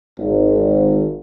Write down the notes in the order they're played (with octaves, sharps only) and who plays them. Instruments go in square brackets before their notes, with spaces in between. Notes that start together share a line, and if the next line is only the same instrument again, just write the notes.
[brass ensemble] G#1